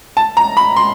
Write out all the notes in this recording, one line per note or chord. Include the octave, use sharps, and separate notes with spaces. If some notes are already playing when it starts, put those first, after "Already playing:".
A5
A#5
B5
C6